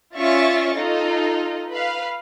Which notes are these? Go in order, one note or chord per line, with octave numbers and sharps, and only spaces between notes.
C#4 F4 D5 E5 C#6 A6
D#4 F4 A4 D#5
B4 F5